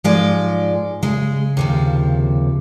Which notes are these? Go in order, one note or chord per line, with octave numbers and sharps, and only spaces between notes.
G#2 F3 G#3 D5
C#3 G#3
D#2 C3 F3